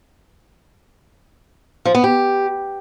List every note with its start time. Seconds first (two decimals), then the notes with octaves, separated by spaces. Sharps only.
1.85 F3
1.95 B3
2.04 G4